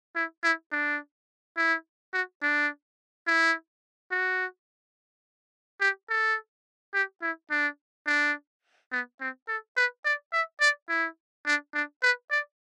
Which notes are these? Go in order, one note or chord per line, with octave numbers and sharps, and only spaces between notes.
E4
E4
D4
E4
F#4
D4
E4
F#4
G4
A4
G4
E4
D4
D4
B3
C4
A4
B4
D5
E5
D5
E4
D4
D4
B4
D5